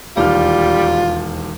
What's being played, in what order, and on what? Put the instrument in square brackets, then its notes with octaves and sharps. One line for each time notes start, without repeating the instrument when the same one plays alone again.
[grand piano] E1 D#2 F6 [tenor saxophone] G3 [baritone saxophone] F4